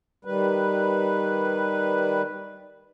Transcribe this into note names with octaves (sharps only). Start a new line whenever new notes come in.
D#3 G3 B4